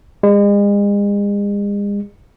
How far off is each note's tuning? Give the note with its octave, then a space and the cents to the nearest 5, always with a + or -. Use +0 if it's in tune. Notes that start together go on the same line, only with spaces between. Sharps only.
G#3 -40